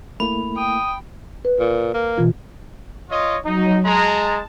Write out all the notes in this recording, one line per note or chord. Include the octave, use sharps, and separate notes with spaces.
A3 A#3 E4 B5
G5 D#6
B4
A#2
A#3
B2 E3 F4
F4 C#5 D#5
F#3 D#4
G#3 A5 A#5